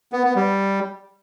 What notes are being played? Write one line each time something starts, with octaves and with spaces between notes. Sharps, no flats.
B3
B3
G3